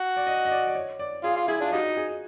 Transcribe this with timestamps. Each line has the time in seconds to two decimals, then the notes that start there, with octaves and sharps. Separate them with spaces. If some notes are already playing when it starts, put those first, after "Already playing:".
Already playing: F#4
0.17 D5
0.27 D#5
0.45 D#5
0.52 D5
0.67 D5
0.75 C#5
0.99 D5
1.24 F4 G#4
1.36 F4
1.48 E4 G#4
1.61 D4 F4
1.72 G3 D#4 F#4
1.97 G#4